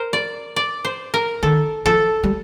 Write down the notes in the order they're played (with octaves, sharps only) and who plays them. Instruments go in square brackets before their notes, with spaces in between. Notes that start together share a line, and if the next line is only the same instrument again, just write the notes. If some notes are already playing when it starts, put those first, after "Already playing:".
Already playing: [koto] A#4 C5
D5
D5
C5
A#4
[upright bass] D#3 [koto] A4
[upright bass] F3 [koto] A4
[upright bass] G3